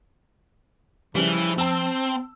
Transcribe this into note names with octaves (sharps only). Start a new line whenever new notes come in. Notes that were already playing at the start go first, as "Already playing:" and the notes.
C#3 E3 F3 G3
C4 A5 E6